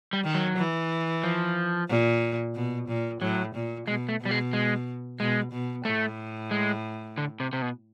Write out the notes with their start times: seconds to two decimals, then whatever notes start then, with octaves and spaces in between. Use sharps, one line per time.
0.13 G3
0.24 D#3
0.35 F#3
0.57 E3
1.24 F3
1.89 A#2
2.55 B2
2.88 A#2
3.21 A2 F#3
3.54 A#2
3.87 B2 G#3
4.09 A3
4.21 B2 G3
4.31 G#3
4.53 G#3
5.19 B2 G#3
5.52 B2
5.85 A2 A3
6.51 G#3
7.18 D3
7.40 C3
7.53 C3
7.62 B2